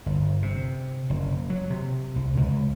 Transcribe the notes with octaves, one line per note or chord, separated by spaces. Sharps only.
G1
C3
F#1
F#3
C3
C2
C#2